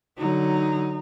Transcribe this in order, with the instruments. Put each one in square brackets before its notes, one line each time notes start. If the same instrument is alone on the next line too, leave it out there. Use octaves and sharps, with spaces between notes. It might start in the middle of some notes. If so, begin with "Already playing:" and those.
[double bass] D3 F#3 [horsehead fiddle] D#4